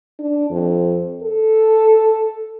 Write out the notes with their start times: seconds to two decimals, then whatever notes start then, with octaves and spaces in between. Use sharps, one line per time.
0.19 D4
0.51 F2
1.23 A4